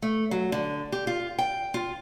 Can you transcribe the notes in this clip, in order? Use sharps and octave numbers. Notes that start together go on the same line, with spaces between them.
A3
F#3
D3
G4
F4
G5
F4